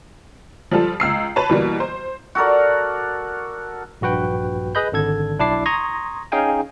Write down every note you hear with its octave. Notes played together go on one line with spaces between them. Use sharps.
F3 G3 F4 A4
C#2 E6 C7
B4 C#5 A5
B2 E3 G3 A#3
C5
F#4 A4 A#4 D5
A#1 G2 F#4 B4 G5
G#4 B4 D#5 B5 G6
G#1 D3 A4 G#6
B1 D4 E4 A5 D6 C7
A#5 C6 C#6 D#6 G#6 A#6
C#4 D#4 G#4 F5 G5 G#5